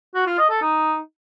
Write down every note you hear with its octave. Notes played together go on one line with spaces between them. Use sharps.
F#4
F4
D#5
A4
D#4